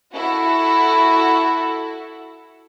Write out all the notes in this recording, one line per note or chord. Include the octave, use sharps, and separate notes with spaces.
E4 F#4 A4